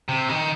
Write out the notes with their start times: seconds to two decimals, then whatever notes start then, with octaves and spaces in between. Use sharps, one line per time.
0.09 C3
0.29 D#3